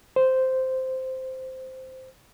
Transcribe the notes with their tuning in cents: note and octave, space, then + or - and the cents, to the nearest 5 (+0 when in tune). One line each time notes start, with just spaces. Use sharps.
C5 -5